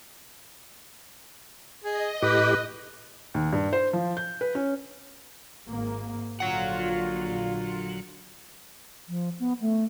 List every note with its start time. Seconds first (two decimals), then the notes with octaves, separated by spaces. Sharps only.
1.84 G#4 D#5
2.22 A2 G4 B4
3.34 D#2
3.53 G2
3.73 C5
3.93 F3
4.17 G6
4.41 B4
4.55 C#4
5.68 G#1 G#2 A#3
6.40 A#1 A#2 D3 F#3 F4 F#5
9.08 F3
9.39 B3
9.61 A3